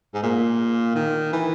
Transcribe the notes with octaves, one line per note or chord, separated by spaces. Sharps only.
G#2
A#2
D#3
E3